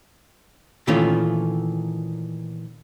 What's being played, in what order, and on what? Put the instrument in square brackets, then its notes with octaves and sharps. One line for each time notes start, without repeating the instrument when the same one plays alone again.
[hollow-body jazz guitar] A#2 D#3 E3 A3 C#4 F4